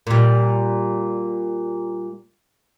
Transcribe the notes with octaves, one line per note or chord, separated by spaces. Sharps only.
A#2 G3